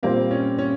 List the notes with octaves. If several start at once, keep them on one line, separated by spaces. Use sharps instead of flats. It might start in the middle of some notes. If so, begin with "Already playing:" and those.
A#2 G3 A#3 C4 F4 C5
C#4
C#4